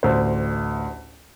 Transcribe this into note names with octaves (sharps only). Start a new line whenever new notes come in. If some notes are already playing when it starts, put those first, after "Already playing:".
A1 D2 C5